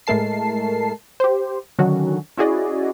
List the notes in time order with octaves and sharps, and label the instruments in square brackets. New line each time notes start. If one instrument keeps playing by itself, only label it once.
[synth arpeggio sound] A2 G#3 A3 A#4 A5 C7
G4 C5
D3 D#3 F#3 C#4 F#4
C#4 E4 F#4 G#4 D5 D#5